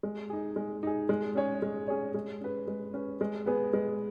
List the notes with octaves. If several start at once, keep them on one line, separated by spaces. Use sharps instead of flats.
G#3
D#4 G#4
G#3
D#4 G#4
G#3
C#4 G#4 C#5
G#3
C#4 G#4 C#5
G#3
C#4 B4
G#3
C#4 B4
G#3
B3 G#4 B4
G#3